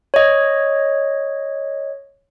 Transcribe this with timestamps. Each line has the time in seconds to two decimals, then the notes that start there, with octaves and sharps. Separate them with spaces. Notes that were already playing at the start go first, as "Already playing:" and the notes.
0.14 C#5 D#5